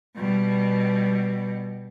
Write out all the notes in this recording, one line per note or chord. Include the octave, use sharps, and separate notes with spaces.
B2 G3